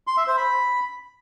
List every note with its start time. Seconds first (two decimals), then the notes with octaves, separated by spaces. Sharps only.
0.07 C6
0.17 E5
0.27 C5
0.37 B5